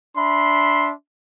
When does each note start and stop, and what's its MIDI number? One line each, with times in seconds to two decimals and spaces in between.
0.17 0.91 62
0.17 0.91 76
0.17 0.91 83
0.17 0.91 84